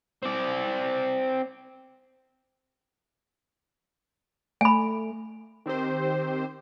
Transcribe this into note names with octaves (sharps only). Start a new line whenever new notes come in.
C4 D5
A3 G#5 B5
D#3 C4 G4 C5